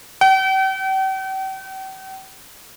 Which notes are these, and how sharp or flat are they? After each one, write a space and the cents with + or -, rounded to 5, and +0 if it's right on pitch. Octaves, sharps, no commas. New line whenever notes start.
G5 -40